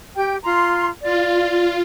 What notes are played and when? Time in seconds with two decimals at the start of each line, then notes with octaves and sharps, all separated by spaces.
0.16 G4 G5
0.44 F4 A#5 C6
1.03 F4 D5